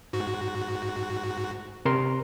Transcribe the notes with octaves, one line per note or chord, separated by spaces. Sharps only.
G#2 F#4
C3 A#4 C6